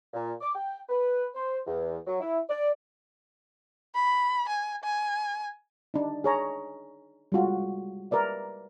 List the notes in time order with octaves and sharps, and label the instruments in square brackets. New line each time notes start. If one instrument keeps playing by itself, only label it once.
[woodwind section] A#2
D6
G5
B4
C5
E2
F#3
E4
D5
[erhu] B5
G#5
G#5
[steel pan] D4 D#4
G#4 C#5 A#5
G3 G#3 F4 F#4
A#4 B4 D5 E5